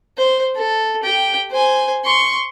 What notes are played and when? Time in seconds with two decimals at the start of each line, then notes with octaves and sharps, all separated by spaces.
0.17 C5
0.55 A4
1.03 G4 G5
1.51 C5 G#5
2.04 C6 C#6